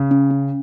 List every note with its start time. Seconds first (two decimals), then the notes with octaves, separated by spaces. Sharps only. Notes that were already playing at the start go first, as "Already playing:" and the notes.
Already playing: C#3
0.11 C#4
0.31 C#4